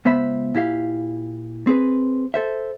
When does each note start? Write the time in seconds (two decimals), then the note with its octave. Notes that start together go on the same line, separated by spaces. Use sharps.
0.05 C#2 B3 C5 E5 B5
0.55 A#2 E4 G4 F5
1.67 C4 G#4 B4
2.34 A4 C5 E5